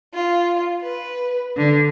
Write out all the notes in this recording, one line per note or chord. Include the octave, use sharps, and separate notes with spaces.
F4
B4
D3